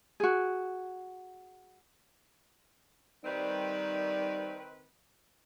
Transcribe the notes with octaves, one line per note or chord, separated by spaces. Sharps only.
F#4 G#4
D#3 G3 C4 D#4 B4 D5